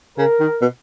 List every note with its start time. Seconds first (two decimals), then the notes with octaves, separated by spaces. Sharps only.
0.18 C#3 A#4
0.40 D#3
0.61 B2